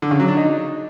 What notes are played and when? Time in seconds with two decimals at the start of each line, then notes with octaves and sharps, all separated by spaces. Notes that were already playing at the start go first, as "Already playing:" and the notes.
0.02 D3
0.11 C#3
0.20 F#3
0.28 D4
0.37 D#4